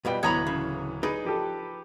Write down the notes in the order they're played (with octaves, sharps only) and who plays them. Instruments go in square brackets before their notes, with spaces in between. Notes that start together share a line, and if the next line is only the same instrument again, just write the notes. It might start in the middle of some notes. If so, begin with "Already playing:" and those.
[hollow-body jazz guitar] F2 B2 G3 [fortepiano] B4 [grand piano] D5 D#5 G5
[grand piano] D1 E3 D#6 [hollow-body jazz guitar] B3 [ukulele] C#5 A#5 B5
[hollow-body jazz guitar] C#3
[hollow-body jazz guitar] D#4 D5 [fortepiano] G#4 [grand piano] B4
[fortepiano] F3 G4 A4